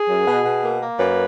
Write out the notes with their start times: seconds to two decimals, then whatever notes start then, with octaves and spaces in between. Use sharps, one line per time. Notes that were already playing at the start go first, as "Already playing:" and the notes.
Already playing: G#4
0.09 F#2
0.28 B2
0.45 B2
0.63 A#3
0.81 A#3
0.99 F#2 B4